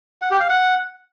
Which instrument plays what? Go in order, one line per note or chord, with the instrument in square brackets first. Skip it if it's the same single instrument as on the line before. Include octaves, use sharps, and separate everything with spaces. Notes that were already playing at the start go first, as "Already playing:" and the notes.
[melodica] F#5
G4
F5
F#5